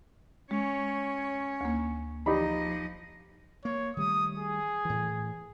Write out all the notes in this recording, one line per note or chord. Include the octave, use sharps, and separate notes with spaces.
G#3 C#4 C#5
D2 A#3
F3 D#4 G4 D#5 B5
A#3 C#5
D#3 G3 A3 D#6
G#4
A2 E3